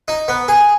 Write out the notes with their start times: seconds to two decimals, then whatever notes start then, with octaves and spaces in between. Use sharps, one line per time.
0.08 D#4
0.28 B3
0.48 G#4